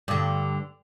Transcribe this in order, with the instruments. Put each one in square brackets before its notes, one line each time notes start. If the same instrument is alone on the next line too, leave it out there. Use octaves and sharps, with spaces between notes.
[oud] G2 D3